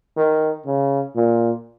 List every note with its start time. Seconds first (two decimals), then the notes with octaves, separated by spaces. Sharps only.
0.17 D#3
0.66 C#3
1.16 A#2